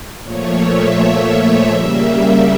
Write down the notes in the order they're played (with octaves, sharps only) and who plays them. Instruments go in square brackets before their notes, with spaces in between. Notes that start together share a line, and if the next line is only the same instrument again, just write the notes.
[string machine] A#2 F3 A3 C#5
E5
C#3 G3 A#3